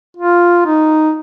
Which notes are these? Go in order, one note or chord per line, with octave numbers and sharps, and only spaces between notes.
F4
D#4